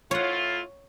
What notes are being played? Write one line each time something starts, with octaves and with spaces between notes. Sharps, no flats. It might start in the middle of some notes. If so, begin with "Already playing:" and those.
A2 E4 F4 C#5 F#5